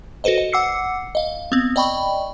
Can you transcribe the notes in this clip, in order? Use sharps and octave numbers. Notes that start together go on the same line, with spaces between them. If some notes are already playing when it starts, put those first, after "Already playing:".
F#4 A4 B4 C5 D#5
D#5
F#5 D6 E6 C7 C#7
D#5 F5
B3 C4
D5 D#5 G5 B5 C#6